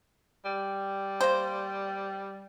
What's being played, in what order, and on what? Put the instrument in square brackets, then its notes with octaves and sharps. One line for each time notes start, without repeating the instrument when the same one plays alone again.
[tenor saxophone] G3
[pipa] A#3 C5